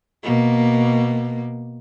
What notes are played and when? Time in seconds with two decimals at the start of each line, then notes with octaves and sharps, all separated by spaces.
0.24 B2 A#3